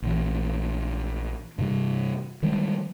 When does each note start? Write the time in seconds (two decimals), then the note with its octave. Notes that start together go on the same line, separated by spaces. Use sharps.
0.02 A#1 E3
1.58 G2 C3 G3
2.42 D#3 F3 G3 G#3